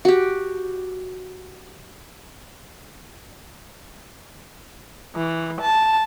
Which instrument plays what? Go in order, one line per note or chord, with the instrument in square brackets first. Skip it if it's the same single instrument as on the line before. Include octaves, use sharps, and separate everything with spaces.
[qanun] F#4 G4
[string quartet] E3
A5